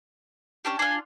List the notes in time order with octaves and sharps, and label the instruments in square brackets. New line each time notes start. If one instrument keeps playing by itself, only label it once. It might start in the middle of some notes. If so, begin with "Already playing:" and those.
[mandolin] C#4 D4 G4
[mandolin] D4 F4 [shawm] G#5